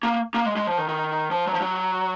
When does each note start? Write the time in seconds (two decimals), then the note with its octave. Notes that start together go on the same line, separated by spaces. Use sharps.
0.03 A#3
0.34 A#3
0.46 G#3
0.56 G#3
0.67 F3
0.78 D#3
0.88 D#3
1.31 F3
1.47 F#3
1.54 F3
1.61 F#3